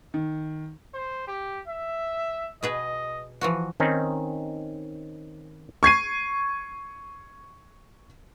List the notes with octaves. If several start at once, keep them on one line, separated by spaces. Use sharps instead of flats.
D#3
C5
G4
E5
B2 G#4 B4 D#5
E3 F3 F#4
D#3 C4 C#4 D#4
C#6 G#6 C7 D#7